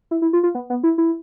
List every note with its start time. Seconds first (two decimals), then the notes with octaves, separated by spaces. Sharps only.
0.11 E4
0.22 E4
0.33 F4
0.43 F4
0.55 B3
0.70 B3
0.83 E4
0.98 E4